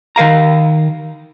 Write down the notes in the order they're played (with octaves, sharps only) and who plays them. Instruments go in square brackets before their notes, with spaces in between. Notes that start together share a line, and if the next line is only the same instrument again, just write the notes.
[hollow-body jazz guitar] D#3 A#4 F5 A#5